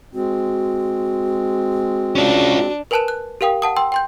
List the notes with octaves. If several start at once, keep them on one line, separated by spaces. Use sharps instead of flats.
G#3 C4 F#4
C#4 D4 F4
A#4 B4 G#5 A5 F#6 E7
F#6
G4 A#4 F5 G5 D#6
F#5 A5 D#6
G5 C6 E6
G5 C6 G6